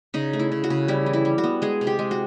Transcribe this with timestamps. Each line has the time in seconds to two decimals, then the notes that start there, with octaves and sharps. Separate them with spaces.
0.14 C#3 D#4
0.33 A3
0.39 E4
0.52 C#3
0.64 F#4
0.70 C#3
0.88 G3 E4
1.06 E3
1.13 E4
1.25 G3
1.38 F#4
1.44 B3
1.62 G#3 G#4
1.81 C3
1.87 G4
1.99 G#3
2.11 F#4